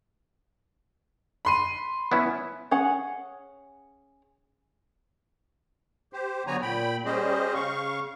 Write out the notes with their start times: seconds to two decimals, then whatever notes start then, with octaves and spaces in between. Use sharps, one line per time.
1.45 B5 C6 D#7
2.12 B3 C#4 E4
2.71 C#4 G#4 F#5
6.13 G4 C5
6.47 D3 F#3 B3 C#5 G#5 A#5
6.62 A#2 G5 B5
7.05 G3 C#4 G4 G#4 C5 D#5
7.54 C#3 F5 C#6